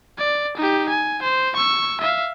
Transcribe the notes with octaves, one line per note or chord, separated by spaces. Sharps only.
D5
D#4 G4
G#5
C5
C#6 E6
E5 F5